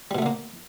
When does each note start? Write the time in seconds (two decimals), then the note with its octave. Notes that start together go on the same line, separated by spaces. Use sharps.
0.11 G3
0.15 B2
0.18 A3
0.22 D3
0.26 A#3